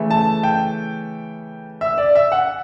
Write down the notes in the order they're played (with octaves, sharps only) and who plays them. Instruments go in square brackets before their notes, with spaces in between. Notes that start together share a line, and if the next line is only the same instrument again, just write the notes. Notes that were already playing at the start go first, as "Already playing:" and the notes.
Already playing: [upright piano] C#3 E3 A3
A5
G5
E5
D5
E5
F#5